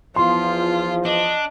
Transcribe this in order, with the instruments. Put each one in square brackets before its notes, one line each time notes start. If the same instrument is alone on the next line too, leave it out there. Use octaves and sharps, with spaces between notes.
[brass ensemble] E2 F3 [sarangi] F4 [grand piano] C6
[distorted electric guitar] D4 [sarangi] D#5